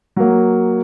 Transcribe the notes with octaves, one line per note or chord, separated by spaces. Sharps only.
F#3 A#3